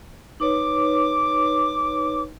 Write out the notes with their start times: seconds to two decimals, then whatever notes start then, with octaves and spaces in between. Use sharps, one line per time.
0.40 D#4 B4 C#5 D6